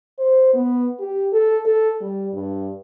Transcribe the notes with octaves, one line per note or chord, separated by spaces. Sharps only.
C5
B3
G4
A4
A4
G3
G2